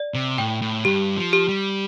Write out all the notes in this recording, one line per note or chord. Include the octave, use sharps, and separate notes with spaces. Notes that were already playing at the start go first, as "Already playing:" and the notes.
Already playing: D5
C3
A2 G5
A2
G2 G4
F3
G4
G3